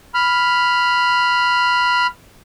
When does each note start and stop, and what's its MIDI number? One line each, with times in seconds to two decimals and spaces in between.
0.15 2.07 83
0.15 2.07 89